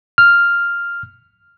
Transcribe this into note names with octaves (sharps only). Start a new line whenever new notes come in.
F6